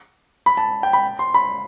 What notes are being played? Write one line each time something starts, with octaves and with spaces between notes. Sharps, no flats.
B5
A5
G5
B5
C6
B5